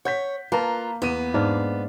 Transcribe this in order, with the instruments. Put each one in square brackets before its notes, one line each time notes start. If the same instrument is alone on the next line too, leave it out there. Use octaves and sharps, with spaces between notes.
[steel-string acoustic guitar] C#5 [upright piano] F#5 G6 B6
[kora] A#3 [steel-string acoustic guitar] F4 [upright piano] B4 A5 A#5
[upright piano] E2 D#7 [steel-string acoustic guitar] B3
[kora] G#2 D4 F5